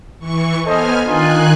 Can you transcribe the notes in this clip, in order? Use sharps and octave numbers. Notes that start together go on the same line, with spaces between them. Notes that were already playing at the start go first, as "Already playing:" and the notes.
E3 C#6
B3 A4 C5 D#5 G#5 F6
D#3 D4 D#4 F4 G#5 F#6